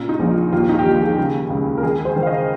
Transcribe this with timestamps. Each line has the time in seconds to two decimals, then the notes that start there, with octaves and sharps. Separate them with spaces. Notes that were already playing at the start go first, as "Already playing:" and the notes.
Already playing: A#2 C#3 F4
0.09 D#4
0.19 A#1
0.30 F4
0.52 D#2 F4
0.69 D#4
0.79 G4
0.85 D#2 F4
1.02 G#4
1.18 C#3
1.50 C#2
1.78 A#4
1.83 D#3 G#4
2.05 C5
2.16 D#3
2.23 F5
2.27 D#5